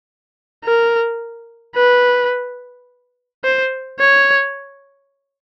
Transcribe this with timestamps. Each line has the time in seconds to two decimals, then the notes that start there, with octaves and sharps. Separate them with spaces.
0.64 A#4
1.76 B4
3.44 C5
4.00 C#5